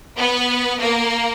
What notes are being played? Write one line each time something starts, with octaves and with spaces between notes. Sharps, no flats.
B3 B4
A#3 A#4